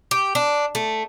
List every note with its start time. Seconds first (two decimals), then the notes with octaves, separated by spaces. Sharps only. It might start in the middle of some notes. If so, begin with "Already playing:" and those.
0.11 G4
0.35 D4
0.75 A3